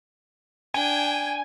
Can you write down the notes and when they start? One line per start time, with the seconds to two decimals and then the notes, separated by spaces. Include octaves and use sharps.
0.74 D4 G5 G#5